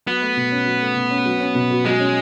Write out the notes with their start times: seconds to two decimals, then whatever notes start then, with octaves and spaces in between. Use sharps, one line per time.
0.07 F#3 B3
0.22 A3
0.37 B2
0.52 C#4
0.66 F#3
0.81 A3
0.96 B2
1.11 C#4
1.26 F#3
1.40 C#4
1.55 B2
1.70 F#4
1.85 F#3 G#3
2.00 C#4